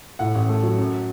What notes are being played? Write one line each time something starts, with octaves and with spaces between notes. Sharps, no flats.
A2 F#5
A1
A3
F#3
F#2